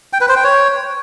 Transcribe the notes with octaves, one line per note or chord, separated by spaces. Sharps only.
G5
B4
C5
G5
C#5